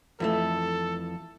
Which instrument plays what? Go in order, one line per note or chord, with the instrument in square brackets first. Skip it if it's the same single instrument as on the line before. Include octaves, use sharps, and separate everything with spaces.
[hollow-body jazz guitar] F2 E3 A3 [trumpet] A4